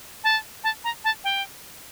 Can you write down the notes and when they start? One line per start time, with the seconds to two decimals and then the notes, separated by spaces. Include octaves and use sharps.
0.24 A5
0.64 A5
0.84 A#5
1.04 A5
1.24 G5